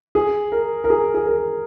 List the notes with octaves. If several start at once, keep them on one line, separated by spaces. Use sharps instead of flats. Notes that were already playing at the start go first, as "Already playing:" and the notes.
G#4
A#4
A#4
G#4
G#4
A#4